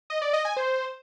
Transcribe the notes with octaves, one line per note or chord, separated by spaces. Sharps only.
D#5
D5
D#5
G#5
C5